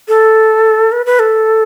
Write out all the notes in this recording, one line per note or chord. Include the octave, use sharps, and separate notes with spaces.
A4
B4
B4
A4